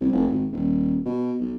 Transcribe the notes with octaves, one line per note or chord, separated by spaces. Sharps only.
C2
F1
G#1
D#1
B2
B1